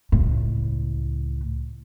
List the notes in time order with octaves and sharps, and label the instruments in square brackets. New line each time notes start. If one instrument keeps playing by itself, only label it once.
[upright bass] C#2 A2